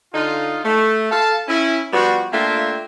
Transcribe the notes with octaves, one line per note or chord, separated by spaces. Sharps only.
D3 D#4 F4
A3
A4 F5 A5
C#4 E4
F3 G3 B3 F#4
A3 A#3 D4 F4 E5 G5